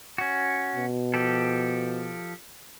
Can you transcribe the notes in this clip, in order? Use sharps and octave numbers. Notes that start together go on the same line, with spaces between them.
C#4 F#4
B2
F3 G4 A4